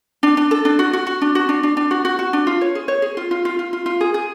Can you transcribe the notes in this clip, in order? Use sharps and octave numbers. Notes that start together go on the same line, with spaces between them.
D4
D4
A4
D4
F#4
F#4
F#4
D4
F#4
D4
D4
D4
F#4
F#4
F#4
D4
F4
C#5
G#4
C#5
G#4
F4
F4
F4
F4
F4
F4
G#4
G#4